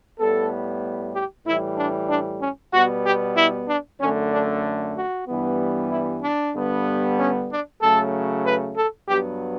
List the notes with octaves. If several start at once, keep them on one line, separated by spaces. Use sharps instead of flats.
A2 G3 B3 A4
G4
A2 E3 G3 E4
D4
D4
C#4
B2 G3 B3 F#4
G4
E4
D4
F#2 D3 A3 C#4
D4
F#4
G2 E3 G3 B3
E4
D4
G2 D3 G3 B3
C#4
D4
C#3 F#3 A3 A4
B4
A4
G2 F#3 B3 G4